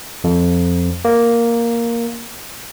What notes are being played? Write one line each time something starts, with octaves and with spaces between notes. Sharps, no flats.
F2
A#3